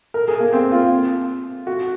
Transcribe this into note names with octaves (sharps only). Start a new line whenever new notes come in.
A#4
G#4
A#3
C4
F4
F#4